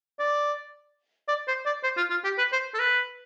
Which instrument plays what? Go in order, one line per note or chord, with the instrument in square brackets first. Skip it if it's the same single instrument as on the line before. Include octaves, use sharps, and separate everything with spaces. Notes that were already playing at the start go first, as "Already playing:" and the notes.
[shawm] D5
D5
C5
D5
C5
F4
F4
G4
B4
C5
A4
B4